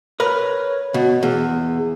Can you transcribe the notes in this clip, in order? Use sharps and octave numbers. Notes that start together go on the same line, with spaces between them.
A#4 B4 C#5
B2
E2 G#4